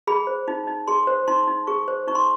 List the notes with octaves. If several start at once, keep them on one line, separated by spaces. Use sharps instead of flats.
G#4 B5
C5
D#4
D#4
G#4 C6
C5
D#4 C6
D#4
G#4 C#6
C5
D#4 C#6
C6